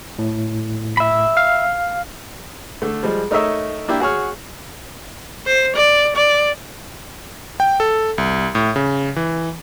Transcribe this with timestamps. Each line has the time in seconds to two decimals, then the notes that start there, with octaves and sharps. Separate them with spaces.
0.19 A2
0.97 E5 B5
1.37 F5
2.82 D3 A3
3.03 F3 G3 G#3
3.31 A3 D#4 A#4 C#5 D#5 E5
3.88 A#3 D4 E4 G4 G5
4.00 F#4 G#4 C#5 F6
5.47 C5
5.76 D5
6.16 D5
7.60 G5
7.80 A4
8.18 C2
8.55 A2
8.76 C#3
9.16 E3